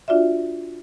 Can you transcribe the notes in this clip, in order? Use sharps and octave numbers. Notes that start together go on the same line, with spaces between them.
D4 F4 F#4 D5 E5